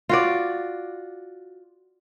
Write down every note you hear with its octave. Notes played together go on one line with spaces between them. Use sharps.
F4 F#4 D5